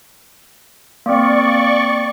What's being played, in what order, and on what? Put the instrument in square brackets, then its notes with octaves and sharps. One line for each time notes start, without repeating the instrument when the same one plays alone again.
[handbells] A#3 C4 [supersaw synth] D5 C#6